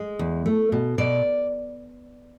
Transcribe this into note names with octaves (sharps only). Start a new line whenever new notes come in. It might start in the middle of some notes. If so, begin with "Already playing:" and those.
Already playing: G#3
E2
A3
B2
B2 D5